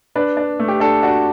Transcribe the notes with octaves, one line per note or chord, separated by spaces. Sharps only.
D4 B4
D4
A3
G4
D4 A4
D4 F#4